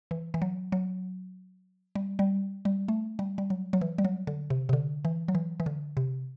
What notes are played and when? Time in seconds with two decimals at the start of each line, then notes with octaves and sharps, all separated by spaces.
0.11 E3
0.34 E3
0.42 F#3
0.72 F#3
1.95 G3
2.19 G3
2.65 G3
2.88 A3
3.19 G3
3.38 G3
3.50 F#3
3.73 F#3
3.81 E3
3.98 G3
4.05 F#3
4.27 D3
4.50 C3
4.69 C3
4.73 D3
5.05 E3
5.28 F#3
5.35 E3
5.60 E3
5.66 D3
5.97 C3